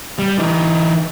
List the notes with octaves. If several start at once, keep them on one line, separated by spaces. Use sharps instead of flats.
G3
E3 D#4